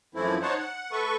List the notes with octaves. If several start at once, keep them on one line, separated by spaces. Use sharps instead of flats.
F#2 E3 F3 A3 C4 E4
D#4 C5 C#5 F#5 A5
F#5
A3 A4 B4 C#6